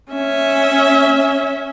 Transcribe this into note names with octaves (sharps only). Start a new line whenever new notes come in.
C#4 E5